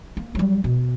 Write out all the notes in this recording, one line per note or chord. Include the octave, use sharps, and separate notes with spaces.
A#3
F#3 G3
B2